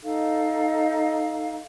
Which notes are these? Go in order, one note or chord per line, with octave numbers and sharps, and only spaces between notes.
D#4 A4 F5